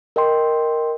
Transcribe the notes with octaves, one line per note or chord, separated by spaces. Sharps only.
A#4 D#5 G5 C6